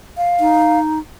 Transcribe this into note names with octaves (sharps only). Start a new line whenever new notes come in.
F5
D#4